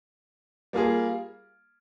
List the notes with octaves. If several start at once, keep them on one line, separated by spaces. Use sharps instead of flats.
G3 A#3 F4 G#4